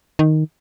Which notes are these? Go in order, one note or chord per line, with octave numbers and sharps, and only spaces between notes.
D#3